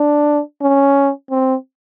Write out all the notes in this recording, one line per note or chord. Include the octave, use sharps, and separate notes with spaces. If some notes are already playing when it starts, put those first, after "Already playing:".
Already playing: D4
C#4
C4